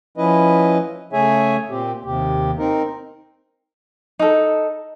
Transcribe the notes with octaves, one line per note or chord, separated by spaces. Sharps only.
F3 C#4 E4 B4 D#5
C#3 A3 G#4 C#5 E5 G#5
A#2 C4 G4
D#2 C3 G4
C4 D#4 A#4
D#4 A4